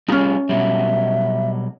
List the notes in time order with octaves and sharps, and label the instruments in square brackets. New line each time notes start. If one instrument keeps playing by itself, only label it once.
[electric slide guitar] G3 F4 G#4 [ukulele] C#4 D#4
[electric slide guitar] B2 F#3 G3 [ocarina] E5